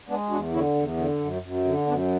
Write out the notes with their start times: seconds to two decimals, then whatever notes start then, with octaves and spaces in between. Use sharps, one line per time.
0.08 G#3 B3 D4
0.30 E2 D4 F#4
0.53 D3 C#4 E4
0.75 E2
0.97 D3
1.20 F#2
1.42 F#2
1.64 D3
1.86 F#2 B3 D4